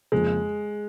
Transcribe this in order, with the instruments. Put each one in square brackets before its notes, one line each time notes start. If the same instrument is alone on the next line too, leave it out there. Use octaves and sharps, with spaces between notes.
[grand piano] F2 C#3 F3 A#3 F4 [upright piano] G#3